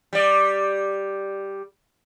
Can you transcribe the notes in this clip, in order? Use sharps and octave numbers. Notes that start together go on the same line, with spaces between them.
G3 D5